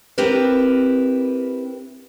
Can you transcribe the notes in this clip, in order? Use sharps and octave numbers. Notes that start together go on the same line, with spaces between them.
C4 E4 G4 A#4 B4